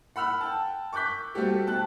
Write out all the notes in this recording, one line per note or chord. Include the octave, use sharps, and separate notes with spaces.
F#5 B5 E6 F6
G5 A5
C#6 D6 F#6 G6 B6
G3 A3 C4 F#4 G4 A4
B2 G5 A5 F#6